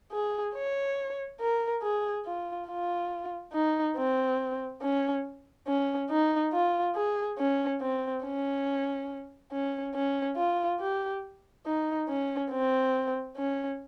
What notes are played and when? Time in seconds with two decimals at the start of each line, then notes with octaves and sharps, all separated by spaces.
0.12 G#4
0.54 C#5
1.40 A#4
1.82 G#4
2.25 F4
2.68 F4
3.53 D#4
3.96 C4
4.82 C#4
5.67 C#4
6.10 D#4
6.53 F4
6.95 G#4
7.38 C#4
7.81 C4
8.24 C#4
9.52 C#4
9.95 C#4
10.37 F4
10.80 G4
11.66 D#4
12.08 C#4
12.51 C4
13.36 C#4